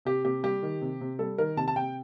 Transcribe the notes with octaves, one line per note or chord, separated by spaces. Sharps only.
C3 G4
C3 G4
G3 G4
D#3
C3
C3
G3 A4
D#3 A#4
C3 A5
A5
C3 G5